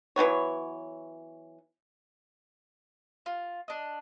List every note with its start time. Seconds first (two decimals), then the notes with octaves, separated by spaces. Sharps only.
0.16 E3 F#3 B3 C#5
3.26 F4
3.68 D4 D#5